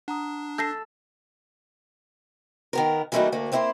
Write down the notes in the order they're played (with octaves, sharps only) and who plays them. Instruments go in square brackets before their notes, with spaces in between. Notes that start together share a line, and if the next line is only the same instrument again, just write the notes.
[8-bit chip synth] D4 [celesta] F#5 A#5 D#6
[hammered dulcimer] A4 [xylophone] G6 A#6 C7
[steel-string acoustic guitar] D#3 B3 A#4
E3 G3 A3 A#3 D#4 F#4
D2 A3 A#3 D4
A#3 C4 E4 G#4 C5